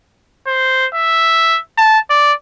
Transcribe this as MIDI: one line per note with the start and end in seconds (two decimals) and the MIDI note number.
0.47 0.86 72
0.95 1.59 76
1.78 1.99 81
2.10 2.33 74